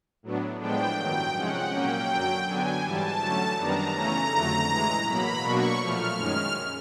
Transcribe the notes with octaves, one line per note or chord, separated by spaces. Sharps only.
A2 F#3 B3 D4
A2 F3 G#3 B3 D4 G5
G2 D#3 F#3 G5
C3 F3 G#3 C#4 F#5
A#2 F#3 A#3 C#4 G5
F#2 D3 F#3
D3 F#3 B3 D4 G#5
G#2 E3 G3 A5
D3 F#3 A3 C#4
F#2 D#3 G3 B3 D4 A#5
C#3 E3 A3 C#4 A#5
F2 D3 F#3 A3
A2 E3 G#3
B2 F#3 A#3 B5
B2 F#3 A#3 D4 C#6
A#2 F3 A3 F6
F#2 D#3 G#3 C#4 F6